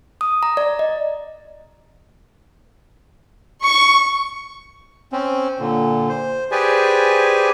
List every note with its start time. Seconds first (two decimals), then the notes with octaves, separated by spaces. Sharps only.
0.21 D#6
0.43 A#5
0.57 D5
0.79 D#5
3.66 C#6
5.12 C4 C#4
5.60 A#2 D3
6.09 C5
6.51 G4 G#4 B4 C5 D5 G#5